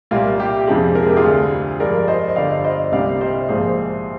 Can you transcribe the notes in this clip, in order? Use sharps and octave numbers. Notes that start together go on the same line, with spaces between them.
C2 A#2 G3 A#3 F4
G4
F2 C3 F3 G#3
A#4
G#4
G4
F4 G#4
D2 D3 G3
G2 F3 G#3 A#4 D5
D5
C5 D#5
D#5
G1 G2 D3 D5 F5
C5 D#5
C2 C3 G3 A#3 D5 F5
C5 D#5
A#1 G#2 F3 A#3 G#4 C5